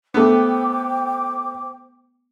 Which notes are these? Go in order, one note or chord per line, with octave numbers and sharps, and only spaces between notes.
A3 B3 C5 G5 D6